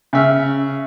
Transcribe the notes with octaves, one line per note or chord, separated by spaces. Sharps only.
C#3 E5 F6